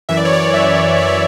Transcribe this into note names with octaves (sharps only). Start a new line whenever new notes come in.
F#2 E3 E5
D5
C#5
D5
F#2 E3 E5
F#2 E3 D5
C#5